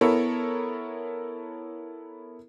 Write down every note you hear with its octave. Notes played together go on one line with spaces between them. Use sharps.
B3 E4 A4 A#4 C#5